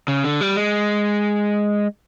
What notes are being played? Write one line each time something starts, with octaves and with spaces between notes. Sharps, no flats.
C#3
D3
G3
G#3